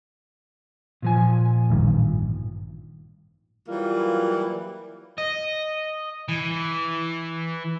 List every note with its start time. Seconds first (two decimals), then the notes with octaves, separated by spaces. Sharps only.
1.02 A#2 F3 G#5
1.70 A1 G2 D#3
3.68 E3 F#3 G3 A#3 F4
5.18 D#5
6.29 E3